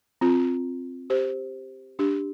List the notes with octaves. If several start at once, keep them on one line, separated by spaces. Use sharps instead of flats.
C4 F4
G4 C5
D4 G4